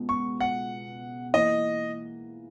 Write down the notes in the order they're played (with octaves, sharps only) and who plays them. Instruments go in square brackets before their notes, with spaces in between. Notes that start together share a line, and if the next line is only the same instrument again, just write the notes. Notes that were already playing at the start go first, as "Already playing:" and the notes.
Already playing: [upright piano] C#2 B2
[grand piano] C#6
F#5
[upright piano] E3 A#3 [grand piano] D#5